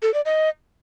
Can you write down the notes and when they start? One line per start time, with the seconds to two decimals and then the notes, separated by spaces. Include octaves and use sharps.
0.02 A4
0.14 D5
0.26 D#5